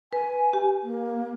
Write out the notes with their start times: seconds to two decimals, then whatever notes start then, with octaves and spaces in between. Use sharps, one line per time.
0.13 B4 G#5
0.53 G4
0.83 A#3